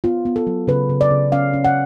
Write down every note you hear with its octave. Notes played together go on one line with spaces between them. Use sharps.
B3 F4
B3
A4
F#3
C#3 B4
C#3
D5
C#3
C#4 F5
C#4
F#5